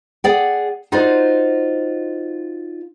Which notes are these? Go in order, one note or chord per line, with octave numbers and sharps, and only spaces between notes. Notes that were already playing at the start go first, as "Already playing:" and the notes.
G#4 D5 F#5 G5
D#4 F4 F#4 C5 D5 D#5